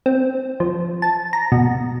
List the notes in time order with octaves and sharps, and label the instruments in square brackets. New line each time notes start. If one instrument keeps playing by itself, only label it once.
[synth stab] C4
F3
A5
A#5
B2